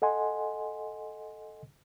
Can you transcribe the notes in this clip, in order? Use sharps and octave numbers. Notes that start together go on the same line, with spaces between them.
A4 D#5 F#5 G#5 C6